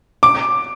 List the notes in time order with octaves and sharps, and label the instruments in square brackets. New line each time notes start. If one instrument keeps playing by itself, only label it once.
[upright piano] D6